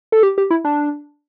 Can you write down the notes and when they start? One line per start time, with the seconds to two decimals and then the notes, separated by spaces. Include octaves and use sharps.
0.12 A4
0.23 G4
0.38 G4
0.51 E4
0.65 D4